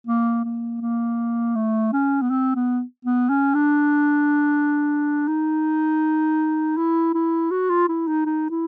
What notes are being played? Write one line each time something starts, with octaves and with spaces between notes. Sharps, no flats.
A#3
A#3
A#3
A3
C#4
B3
C4
B3
B3
C#4
D4
D#4
E4
E4
F#4
F4
E4
D#4
D#4
E4